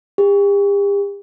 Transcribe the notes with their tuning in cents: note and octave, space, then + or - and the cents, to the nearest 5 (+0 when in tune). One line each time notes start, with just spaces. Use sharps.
G4 +45